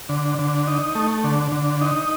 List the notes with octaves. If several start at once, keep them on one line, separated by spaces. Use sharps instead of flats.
D3
D3
D#4
A3
D3
D3
D#4